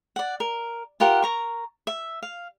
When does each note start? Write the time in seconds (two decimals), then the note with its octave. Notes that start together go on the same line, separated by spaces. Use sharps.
0.16 D5 F#5
0.40 A#4
1.00 F4 G4 A#4 F#5
1.22 A#4 A#5 C#6
1.87 E5
2.22 F5